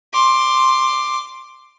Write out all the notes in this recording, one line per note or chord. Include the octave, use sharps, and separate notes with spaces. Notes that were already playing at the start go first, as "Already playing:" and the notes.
C6 D6